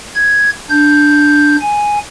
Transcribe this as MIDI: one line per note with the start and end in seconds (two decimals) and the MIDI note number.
0.15 0.50 92
0.70 1.57 62
0.70 1.57 91
1.61 1.99 80